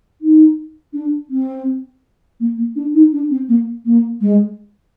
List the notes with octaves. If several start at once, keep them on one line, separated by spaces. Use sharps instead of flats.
D#4
D4
C4
A#3
A#3
D4
D#4
D4
C4
A#3
A#3
G#3